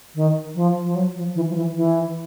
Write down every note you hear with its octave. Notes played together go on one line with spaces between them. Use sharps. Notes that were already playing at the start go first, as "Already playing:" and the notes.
D#3
F3
F3
F#3
F3
E3
F3
E3
E3